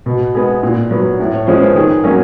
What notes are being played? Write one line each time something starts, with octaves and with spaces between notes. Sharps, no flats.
B2
G#3 B3
A#2
F#3 B3
A2
C#5
F3 G#3 C#4 C5
B4
D#3 G#4
F#3 A#3 C#4